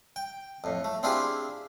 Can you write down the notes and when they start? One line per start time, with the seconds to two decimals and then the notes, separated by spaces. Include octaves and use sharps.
0.16 G5
0.64 F2 A2
0.84 A3
1.03 C4 D4 E4 F4 G4 G#4